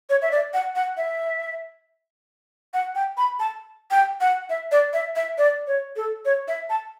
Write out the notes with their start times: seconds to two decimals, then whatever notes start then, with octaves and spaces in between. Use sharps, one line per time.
0.10 C#5
0.22 E5
0.32 D5
0.54 F#5
0.76 F#5
0.97 E5
2.74 F#5
2.95 G5
3.18 B5
3.40 A5
3.91 G5
4.21 F#5
4.50 E5
4.72 D5
4.93 E5
5.16 E5
5.38 D5
5.67 C#5
5.96 A4
6.25 C#5
6.48 E5
6.70 A5